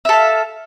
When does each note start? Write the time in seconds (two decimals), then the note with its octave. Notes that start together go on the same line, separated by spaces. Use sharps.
0.05 E5
0.09 A4
0.13 F5